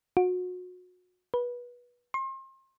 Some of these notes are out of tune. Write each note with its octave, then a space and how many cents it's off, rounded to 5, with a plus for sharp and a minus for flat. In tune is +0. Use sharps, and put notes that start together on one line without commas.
F#4 -30
B4 -25
C6 +35